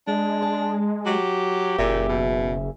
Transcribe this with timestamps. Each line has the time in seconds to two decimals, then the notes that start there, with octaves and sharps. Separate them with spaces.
0.07 G#3 D4
0.42 A5
1.06 F#3 G4
1.78 F#1 A#2 G#4 E5
2.09 B2